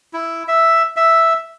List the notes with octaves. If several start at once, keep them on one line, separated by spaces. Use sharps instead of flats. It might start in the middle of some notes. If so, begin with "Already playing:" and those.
E4
E5
E5